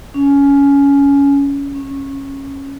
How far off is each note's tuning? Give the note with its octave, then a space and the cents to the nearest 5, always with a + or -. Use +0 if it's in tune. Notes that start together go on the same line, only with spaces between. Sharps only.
C#4 +15
C#4 -15